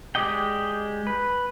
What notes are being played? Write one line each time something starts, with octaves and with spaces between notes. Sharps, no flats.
G#3 G4 D5 D#5 G5
B4